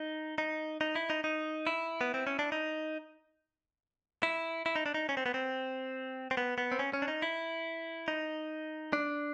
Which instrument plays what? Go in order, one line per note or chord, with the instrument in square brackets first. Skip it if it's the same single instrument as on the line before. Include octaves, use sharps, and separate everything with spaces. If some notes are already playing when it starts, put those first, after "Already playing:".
Already playing: [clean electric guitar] D#4
D#4
D#4
E4
D#4
D#4
E4
B3
C4
C#4
D4
D#4
E4
E4
D#4
D4
D#4
C#4
C4
B3
C4
C4
B3
B3
C4
C#4
C#4
D4
D#4
E4
D#4
D4